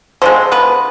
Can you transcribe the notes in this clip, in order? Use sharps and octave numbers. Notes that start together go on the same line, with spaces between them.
D3 F3 G#3 C4 C5
B3 B4